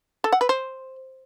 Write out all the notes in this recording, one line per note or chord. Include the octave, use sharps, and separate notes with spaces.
A4
F#5
B4
C5